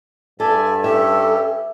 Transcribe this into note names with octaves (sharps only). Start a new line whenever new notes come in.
G2 A4 D5 E5 G#5
C#4 G4 A4 E5